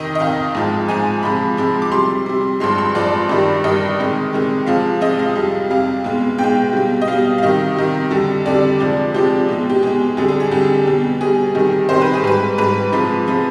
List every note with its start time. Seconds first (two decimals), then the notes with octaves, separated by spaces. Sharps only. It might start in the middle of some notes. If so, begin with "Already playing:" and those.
Already playing: F2 C3 D#3 D#5
0.15 D#5
0.20 F2 C3 D#3 F5
0.55 G#2 F3 G#3
0.88 G#2 F3 G#3 G#5
1.23 C3 F3 G#3 B5
1.57 C3 F3 G#3
1.82 D6
1.92 C3 G3 C6
2.26 C3 G3
2.60 G2 F3 G#3 C6
2.78 C6
2.95 G2 F3 G#3 D5
3.29 G2 D#3 G3
3.64 G2 D#3 G3 D#5
3.98 C3 D#3 G#3
4.33 C3 D#3 G#3
4.66 C3 F3 G#3 F5
5.01 C3 F3 G#3 D#5
5.19 F5
5.35 F2 C3 G3
5.70 F2 C3 G3 F5
6.04 B2 G#3
6.38 B2 G#3 G5
6.73 B2 G3
7.02 D#5
7.07 B2 G3 F5
7.38 F5
7.43 C3 D#3 G3 D#5
7.76 C3 D#3 G3
8.11 F2 D3 G3
8.45 F2 D3 G3 D5
8.79 C3 F3 G#3
9.14 C3 F3 G#3 G4
9.49 B2 G#3
9.69 G4
9.83 B2 G#3 G#4
10.17 F2 D3 G3 G#4
10.28 G#4
10.40 G#4
10.51 F2 D3 G3 G4
10.87 B2 G3
11.21 B2 G3 G#4
11.55 C3 D#3 G3
11.89 C3 D#3 G3 C5
12.02 B4
12.14 G#4
12.24 G#2 G3 B4
12.58 G#2 G3 B4
12.92 C3 F3 G#3
13.27 C3 F3 G#3